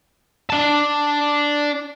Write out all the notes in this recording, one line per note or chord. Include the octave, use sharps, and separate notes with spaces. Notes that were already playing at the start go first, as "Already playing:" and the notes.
D4 A5